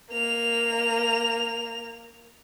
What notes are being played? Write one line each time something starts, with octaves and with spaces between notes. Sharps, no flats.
A#3 F7